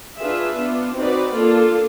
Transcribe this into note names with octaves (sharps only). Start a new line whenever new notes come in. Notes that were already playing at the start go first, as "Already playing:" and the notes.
D4 F4 G#4 B4 E5
B3 D4 F4
C4 D#4 F#4 B4 D5
A#3 D4 F4 A4